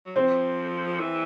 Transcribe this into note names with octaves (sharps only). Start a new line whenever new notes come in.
F#3
F3 C4
E3